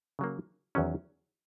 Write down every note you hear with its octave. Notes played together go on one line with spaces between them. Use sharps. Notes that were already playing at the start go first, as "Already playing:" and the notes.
C#3 F#3 A#3
E2 D#3 F#3 C#4